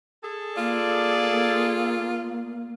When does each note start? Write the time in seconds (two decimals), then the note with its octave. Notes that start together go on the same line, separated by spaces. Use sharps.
0.23 G#4 A4
0.57 A#3 F4 D5